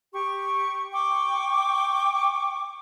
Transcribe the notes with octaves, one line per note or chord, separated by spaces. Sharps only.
G4 C#6
G5 C#6 D6